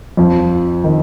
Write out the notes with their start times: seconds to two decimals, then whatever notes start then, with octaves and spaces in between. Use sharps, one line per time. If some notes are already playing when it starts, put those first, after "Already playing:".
0.17 F2 F3
0.84 D#3